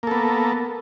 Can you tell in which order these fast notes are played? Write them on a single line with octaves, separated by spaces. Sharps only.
A#3 A4 B3